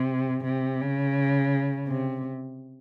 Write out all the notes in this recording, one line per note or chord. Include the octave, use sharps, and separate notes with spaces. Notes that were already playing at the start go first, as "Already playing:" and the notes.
Already playing: C3
C3
C#3
C3